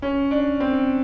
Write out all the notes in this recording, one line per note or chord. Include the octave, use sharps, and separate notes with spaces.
C#4
D4
C4